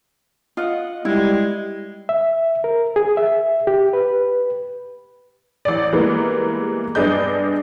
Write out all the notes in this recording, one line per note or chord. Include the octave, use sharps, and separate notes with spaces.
F4 D#5 F#5 D#6
G3 G#3 E4
E5
A#4
G#4
E5
G4
B4
A1 D5
E3 G3 G#3 A#3 B3
G2 B3 D4 G#4 D#5 G6